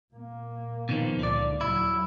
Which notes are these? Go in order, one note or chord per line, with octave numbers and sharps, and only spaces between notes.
A#2 A#3
B2 D#3 F3
C#2 A#2 D3 D5
D#2 F#3 E4